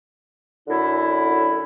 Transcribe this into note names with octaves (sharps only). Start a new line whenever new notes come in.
F#2 D3 E4